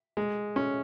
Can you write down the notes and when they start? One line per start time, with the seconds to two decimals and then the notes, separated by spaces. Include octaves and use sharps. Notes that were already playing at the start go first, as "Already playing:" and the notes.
0.17 G#3
0.56 C#4